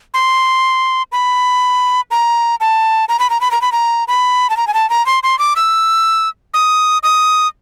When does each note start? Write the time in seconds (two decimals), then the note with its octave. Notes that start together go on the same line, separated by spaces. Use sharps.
0.14 C6
1.12 B5
2.11 A#5
2.61 A5
3.09 A#5
3.19 B5
3.30 A#5
3.41 B5
3.51 A#5
3.62 B5
3.72 A#5
4.08 B5
4.50 A5
4.57 A#5
4.67 G#5
4.74 A5
4.90 A#5
5.06 C6
5.23 C6
5.39 D6
5.56 E6
6.54 D#6
7.03 D#6